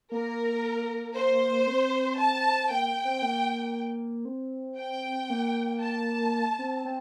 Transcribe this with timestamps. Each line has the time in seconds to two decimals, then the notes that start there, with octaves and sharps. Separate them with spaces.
0.12 A#3 A#4
1.15 C5
1.67 C4
2.19 A5
2.64 C4
2.70 A#3 G5
3.05 C4
3.22 A#3
4.25 C4
4.77 G5
5.30 A#3
5.81 A5
6.59 C4
6.85 C4